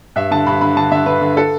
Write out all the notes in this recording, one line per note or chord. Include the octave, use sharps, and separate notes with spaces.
G2 E5
D3 A5
G2 B5
D3 B5
D3 A5
D3 E5
D3 B4
D3
A4